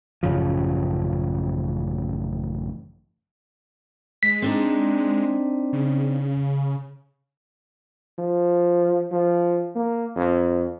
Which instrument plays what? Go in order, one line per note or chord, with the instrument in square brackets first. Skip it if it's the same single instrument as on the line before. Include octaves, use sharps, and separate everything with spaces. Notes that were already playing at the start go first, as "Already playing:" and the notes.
[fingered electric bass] A1 F#2 C#3 F3
[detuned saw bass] G#3 [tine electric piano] B6
[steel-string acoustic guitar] C4 D4 D#4
[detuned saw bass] C#3
[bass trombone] F3
F3
A#3
F2